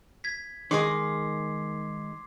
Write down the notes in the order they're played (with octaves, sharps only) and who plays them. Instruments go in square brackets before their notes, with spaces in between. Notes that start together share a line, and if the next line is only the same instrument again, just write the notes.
[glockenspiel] G#6 B6
[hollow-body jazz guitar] D#3 G#3 G#4 [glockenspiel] C6 D6 C7